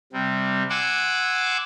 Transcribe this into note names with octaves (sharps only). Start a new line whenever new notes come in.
C3 G3
F#5 G#5 C6 D6 E6